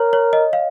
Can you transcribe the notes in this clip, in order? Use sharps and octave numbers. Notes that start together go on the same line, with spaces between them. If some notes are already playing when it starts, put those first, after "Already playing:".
Already playing: A#4 C#5
C#5
D#5
F5